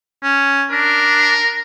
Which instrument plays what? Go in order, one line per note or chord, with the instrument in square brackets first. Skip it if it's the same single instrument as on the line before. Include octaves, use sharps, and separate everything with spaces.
[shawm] C#4
[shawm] D4 [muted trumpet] A#4